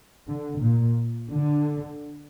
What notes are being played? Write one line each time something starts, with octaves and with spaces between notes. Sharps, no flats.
D3
A#2
D3